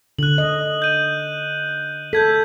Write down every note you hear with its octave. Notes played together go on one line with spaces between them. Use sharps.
D3 F#6 F#7
D#5
G6 D#7
A4 G6 G#6 B6